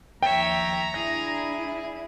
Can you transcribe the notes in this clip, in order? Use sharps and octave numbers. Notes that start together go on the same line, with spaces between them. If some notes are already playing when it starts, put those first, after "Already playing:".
D#2 F3 C#5 E5 G5 A#5
D4 E4 G#4 A#6